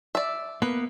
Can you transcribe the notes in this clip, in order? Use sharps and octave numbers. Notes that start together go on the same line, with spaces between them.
D5 E5
A#3 B3 B4